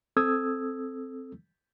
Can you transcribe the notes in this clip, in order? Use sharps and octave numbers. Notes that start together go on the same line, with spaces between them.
C4 A4 D#6 E6 G#6